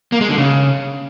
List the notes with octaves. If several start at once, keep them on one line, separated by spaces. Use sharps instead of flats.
A#3
G#3
D3
C#3